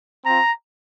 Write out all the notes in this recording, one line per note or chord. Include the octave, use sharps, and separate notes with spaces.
C4 F4 A#5